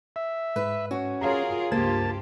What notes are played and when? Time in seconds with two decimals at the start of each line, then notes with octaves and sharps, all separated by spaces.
0.16 E5
0.56 G#2 B4
0.91 C#4 F#4
1.21 F4 G#4 A#4 C#5 F5 A#5
1.72 C#2 G2 A#3 F4 G4 C5 A5 G#6